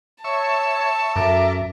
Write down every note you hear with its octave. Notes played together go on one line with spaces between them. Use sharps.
C#5 E5 A5 C#6
F#2 A4 A#4 E5 D6